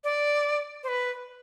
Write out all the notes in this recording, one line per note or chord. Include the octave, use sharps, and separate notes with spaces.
D5
C5
B4